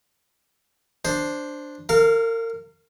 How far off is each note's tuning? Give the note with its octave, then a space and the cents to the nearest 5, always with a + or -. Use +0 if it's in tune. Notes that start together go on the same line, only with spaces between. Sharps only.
D4 +0 C5 +0
A#4 -35 F5 +0